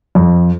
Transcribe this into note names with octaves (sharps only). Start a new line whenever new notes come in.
F2